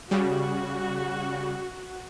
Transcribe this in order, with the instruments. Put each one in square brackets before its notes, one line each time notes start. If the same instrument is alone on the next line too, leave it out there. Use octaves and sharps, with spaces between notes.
[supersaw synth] C#3 G3 [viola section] F#4